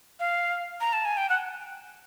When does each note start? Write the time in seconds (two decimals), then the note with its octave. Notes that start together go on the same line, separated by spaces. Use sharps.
0.20 F5
0.81 A#5
0.93 A5
1.05 G#5
1.17 G5
1.30 F#5